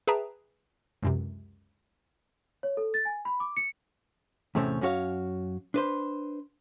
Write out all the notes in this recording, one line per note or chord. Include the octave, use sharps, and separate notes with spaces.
G#4 B4 E5 G5 A5 A#5
C#2 F#2 C3
C#5
A4
A6
G#5
B5
D6
C#7
E2 A2 C3 A3 C4 C#4
F#2 C#4 F#4 C#5 F5
D4 B4 C5